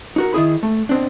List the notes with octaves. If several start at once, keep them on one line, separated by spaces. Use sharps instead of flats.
D#4 F#4 A#4
D#3 E4 G#4 B5
A3
B2 C4 D4